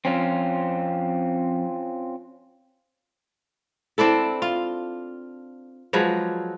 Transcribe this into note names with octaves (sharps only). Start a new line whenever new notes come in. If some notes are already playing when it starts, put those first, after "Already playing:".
F2 C4 C#4 F4
C4 D4 E4 A4
F4
F3 F#3 G#3 B4